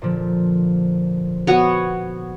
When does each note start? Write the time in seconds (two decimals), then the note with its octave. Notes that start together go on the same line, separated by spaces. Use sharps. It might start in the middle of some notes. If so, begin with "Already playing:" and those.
0.02 A#2 D3 F3
1.47 B3 F#4 C#5